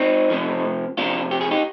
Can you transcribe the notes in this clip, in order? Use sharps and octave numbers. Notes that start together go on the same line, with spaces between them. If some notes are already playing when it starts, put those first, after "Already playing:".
Already playing: C4 D#4
C3 F3
C3 F3 D4 F4
G4
G#4
D#4 G4